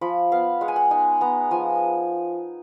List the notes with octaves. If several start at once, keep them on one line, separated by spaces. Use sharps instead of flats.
F3 B5
B3 F5
G#3 F#5
G#5
F#5
D#4 G#5
B3 A#5
F3 G#5